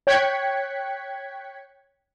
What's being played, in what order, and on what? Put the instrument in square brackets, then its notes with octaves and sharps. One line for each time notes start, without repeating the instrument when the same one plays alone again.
[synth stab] C#5 G5 F#6 G#6 B6 C#7